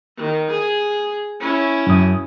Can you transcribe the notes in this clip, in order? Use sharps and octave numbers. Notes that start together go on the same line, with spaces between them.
D#3
G#4
C#4 E4
F#2 D#6